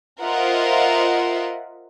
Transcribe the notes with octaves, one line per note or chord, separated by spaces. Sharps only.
F4 A#4 C5 D#5 E5 F#5